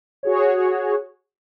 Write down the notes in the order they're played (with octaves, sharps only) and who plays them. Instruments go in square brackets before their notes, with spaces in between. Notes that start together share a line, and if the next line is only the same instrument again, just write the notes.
[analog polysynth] F#4 G#4 C#5